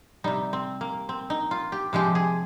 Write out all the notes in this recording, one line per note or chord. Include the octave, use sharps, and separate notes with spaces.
C3 G3 D#4
C4
A#3
C4
D#4
F4
G4
C3 F3 G#3 G4
G#4